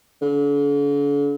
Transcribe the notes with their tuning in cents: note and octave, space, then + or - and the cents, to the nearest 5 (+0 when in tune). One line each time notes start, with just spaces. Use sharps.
D3 -45